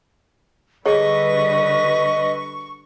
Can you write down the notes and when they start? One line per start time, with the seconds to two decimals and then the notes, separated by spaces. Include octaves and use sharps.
0.86 D3 G3 G#4 B4 C#5 D#5 C#6